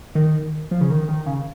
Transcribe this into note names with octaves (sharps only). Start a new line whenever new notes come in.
D#3
F3
C#3
D#3
D#3
C#3